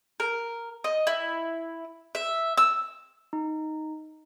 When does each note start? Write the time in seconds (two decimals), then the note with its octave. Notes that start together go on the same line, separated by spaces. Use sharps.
0.20 A#4
0.84 D#5
1.07 E4
2.15 E5
2.58 E6
3.33 D#4